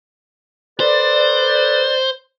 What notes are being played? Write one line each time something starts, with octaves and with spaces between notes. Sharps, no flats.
A4 B4 C5 D5